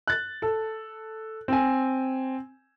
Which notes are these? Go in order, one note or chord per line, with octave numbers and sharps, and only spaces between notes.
F#6 A6
A4
C4 G#5